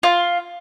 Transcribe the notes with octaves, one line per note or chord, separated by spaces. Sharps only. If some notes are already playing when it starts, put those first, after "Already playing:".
F4